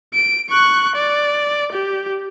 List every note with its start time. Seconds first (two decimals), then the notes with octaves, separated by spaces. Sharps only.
0.14 D7
0.50 C#6 F#6
0.96 D5
1.72 G4